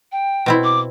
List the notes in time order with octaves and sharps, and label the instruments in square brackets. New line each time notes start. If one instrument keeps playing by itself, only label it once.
[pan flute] G5
[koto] B2 C4 E4
[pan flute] D6